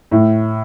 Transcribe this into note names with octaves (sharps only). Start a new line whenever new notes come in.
A2